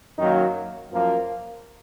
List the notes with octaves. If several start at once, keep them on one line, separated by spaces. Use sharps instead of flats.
F#2 D#3 F#3 A#3 D#4
F#2 F3 A#3